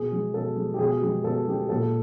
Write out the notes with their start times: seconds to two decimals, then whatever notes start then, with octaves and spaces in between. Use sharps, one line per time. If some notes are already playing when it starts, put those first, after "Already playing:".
Already playing: B2 G#4
0.12 G#3
0.34 B2 A4
0.56 G#3
0.74 G4
0.79 B2 G#4
1.01 G#3 G4
1.24 B2 A4
1.47 G#3 G4
1.69 A#2 A4